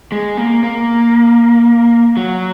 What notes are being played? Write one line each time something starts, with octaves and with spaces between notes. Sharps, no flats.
G#3
A#3
A#3
F#3